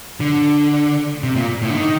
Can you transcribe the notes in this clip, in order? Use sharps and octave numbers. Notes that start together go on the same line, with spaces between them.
D3
C3
A#2
A2
D3
D#3